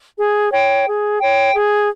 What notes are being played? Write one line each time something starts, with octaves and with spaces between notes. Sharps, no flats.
G#4
C#5 G5
G#4
C#5 G5
G#4